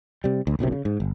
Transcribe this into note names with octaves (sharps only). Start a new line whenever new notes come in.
C3 G3
D2
F#1 B1 F#2 C3
C#3
G#2
G1